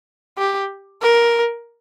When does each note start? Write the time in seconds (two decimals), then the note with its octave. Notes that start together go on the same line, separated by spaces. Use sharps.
0.38 G4
1.02 A#4